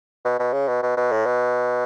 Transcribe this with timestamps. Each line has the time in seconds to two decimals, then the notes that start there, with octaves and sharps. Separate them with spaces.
0.25 B2
0.39 B2
0.53 C#3
0.68 B2
0.83 B2
0.97 B2
1.12 A2
1.26 B2